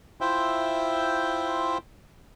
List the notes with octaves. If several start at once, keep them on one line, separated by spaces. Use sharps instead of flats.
E4 F4 C5 E5 G5